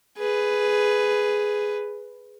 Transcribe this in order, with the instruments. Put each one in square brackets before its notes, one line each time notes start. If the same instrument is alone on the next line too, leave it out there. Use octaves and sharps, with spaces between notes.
[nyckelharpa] G#4 B4